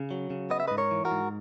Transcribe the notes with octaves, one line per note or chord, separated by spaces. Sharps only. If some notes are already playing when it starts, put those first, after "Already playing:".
Already playing: C#3
F#3
C#3
B3 D#5
E5
G#2 B4 D#5
A#4 C#5
E3
F#4 A#4
G#2